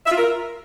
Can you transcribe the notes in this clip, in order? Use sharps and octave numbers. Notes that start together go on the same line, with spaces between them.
E5
F4
A#4